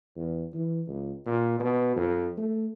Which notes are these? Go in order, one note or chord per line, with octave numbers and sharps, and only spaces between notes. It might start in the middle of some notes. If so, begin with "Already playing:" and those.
E2
E3
C#2
A#2
B2
F2
A3